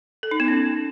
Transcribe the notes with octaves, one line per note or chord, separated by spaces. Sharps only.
A4
D#4
B3
C#4